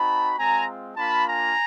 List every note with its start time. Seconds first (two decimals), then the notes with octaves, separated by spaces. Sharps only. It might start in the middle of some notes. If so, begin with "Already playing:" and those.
Already playing: C4 D#4 F#4 A5 B5
0.38 G#3 C4 F4 G#5 A#5
0.97 A#3 D4 F4 A5 B5
1.27 G#5 A#5